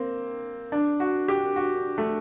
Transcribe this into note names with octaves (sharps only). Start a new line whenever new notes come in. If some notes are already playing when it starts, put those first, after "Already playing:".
Already playing: A#3 C4
D4
F#4
G4
F#4
A3